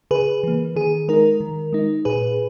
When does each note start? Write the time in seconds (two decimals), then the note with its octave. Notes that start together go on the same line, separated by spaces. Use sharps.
0.11 C#3 G#4 B4
0.43 E3 A#3
0.76 D#3 G#4
1.08 G#3 D#4 A#4
1.40 D#3
1.73 G#3 D#4
2.05 A#2 G#4 B4